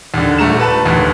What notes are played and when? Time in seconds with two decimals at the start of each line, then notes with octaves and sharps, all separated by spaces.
0.14 D#2 D3
0.38 D#1 A3 A#5 E7
0.60 B4 A5
0.85 G1 D#2